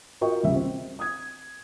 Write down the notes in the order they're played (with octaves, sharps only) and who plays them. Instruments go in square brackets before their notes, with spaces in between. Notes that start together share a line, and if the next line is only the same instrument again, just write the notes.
[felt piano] F4 F#4 A#4 D#5 G5 C#6
F1 C#2 G3 E5
C4
D#6 G#6